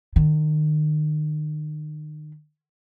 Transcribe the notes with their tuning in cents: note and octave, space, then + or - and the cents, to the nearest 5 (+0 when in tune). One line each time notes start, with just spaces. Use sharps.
D#3 -35